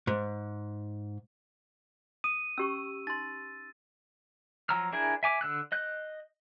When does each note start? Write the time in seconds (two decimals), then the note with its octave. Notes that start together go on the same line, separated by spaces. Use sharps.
0.07 G#2
2.24 D#6 D#7
2.58 C#4 G4 C#6 E6
3.07 D#4 C6 A6
4.69 F3 F#3 A#5 E6 F6
4.92 D4 E4 G#4 A#4 G#5
5.23 E5 G#5 D6
5.41 D3 E6 F#6
5.72 D#5 F#6 G6